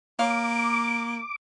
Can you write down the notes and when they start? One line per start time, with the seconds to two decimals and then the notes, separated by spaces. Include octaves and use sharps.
0.19 A#3 C#5 F5 D6